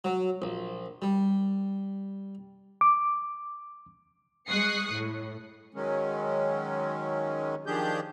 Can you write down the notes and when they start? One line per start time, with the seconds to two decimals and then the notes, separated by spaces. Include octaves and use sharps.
0.04 F#3
0.42 A#1
1.02 G3
2.81 D6
4.48 G#3 C#6 D#6 F#6 C7 C#7
4.92 A2
5.74 D#3 F#3 G#3 C#4
7.66 D#3 F3 D4 G4 G#4 G6